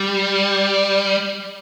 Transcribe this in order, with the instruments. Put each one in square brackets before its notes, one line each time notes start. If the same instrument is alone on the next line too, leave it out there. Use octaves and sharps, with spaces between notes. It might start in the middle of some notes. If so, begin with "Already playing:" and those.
Already playing: [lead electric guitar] G3